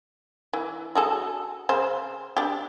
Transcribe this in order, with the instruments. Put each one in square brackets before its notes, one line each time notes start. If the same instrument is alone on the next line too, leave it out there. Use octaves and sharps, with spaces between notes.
[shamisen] E3
F#4 G#4 A4
C#3 C5
D4 G4